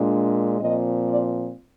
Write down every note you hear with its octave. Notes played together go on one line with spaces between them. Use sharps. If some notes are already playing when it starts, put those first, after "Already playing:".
Already playing: A#2 G#3 D4
A#2 F3 C4 D#5
D5